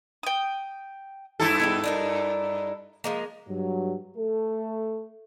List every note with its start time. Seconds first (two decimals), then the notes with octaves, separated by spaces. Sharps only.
0.23 G5 D#6
1.40 G2 E4 A4
1.60 G3 G#3 B3
1.84 D4 D#4 A#4
3.04 F3 G#3 A#3
3.48 G2 F#3
4.16 A3 A4